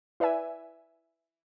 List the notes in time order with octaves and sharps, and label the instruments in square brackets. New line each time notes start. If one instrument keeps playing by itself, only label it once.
[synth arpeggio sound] E4 B4 D5 E5 G#5